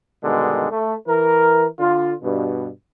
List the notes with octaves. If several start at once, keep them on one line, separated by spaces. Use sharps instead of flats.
G2 B2 D3 D#3 G#3
A3
E3 A#4
D3 F4
G2 B2